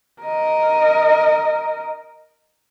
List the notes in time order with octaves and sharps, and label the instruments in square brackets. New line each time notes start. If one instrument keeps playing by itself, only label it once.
[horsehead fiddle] A#4 D#5